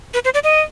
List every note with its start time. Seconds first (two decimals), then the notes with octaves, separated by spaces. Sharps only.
0.14 B4
0.25 C5
0.34 D5
0.44 D#5